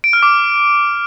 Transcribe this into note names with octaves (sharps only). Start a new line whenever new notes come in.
D7
F6
D6